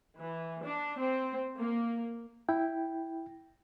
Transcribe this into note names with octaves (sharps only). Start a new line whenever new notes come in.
E3
D4
C4
A#3
E4 G5